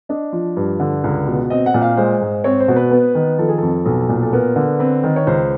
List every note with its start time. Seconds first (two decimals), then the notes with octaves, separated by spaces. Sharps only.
0.09 D4 D#5
0.33 F3
0.57 G2
0.80 D3
1.04 C#2
1.27 B2
1.50 C4 D#5
1.66 F#5
1.74 A#2
1.82 F5
1.97 G#3 C5
2.21 G#2
2.44 C4 C#5
2.60 C5
2.68 B2
2.76 B4
2.91 B3
3.15 D#3
3.38 F3 A4
3.48 G#4
3.58 F2 A4
3.85 B1 A4
4.09 A#2
4.23 A4
4.33 B3 A#4
4.56 D3
4.79 C4 B4
5.04 D#3
5.16 C#5
5.27 C#2 C5